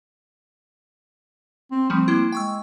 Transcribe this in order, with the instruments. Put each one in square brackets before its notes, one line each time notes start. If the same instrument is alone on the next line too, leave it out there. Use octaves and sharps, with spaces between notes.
[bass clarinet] C4
[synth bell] F3 G3 A3 [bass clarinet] C4
[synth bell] A#3 E4
[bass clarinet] G#3 [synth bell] G5 C#6 E6